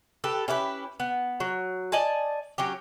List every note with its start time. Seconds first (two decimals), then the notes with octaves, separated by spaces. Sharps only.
0.24 G4 A4 B4
0.48 C#4 E4 G4 B4
1.00 B3
1.40 F#3
1.92 D5 D#5 G#5 A5
2.58 F#3 C#4 G4